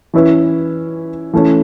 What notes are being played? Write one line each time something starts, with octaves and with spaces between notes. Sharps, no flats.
E3 C#4 E4 B4
E3 A3 C#4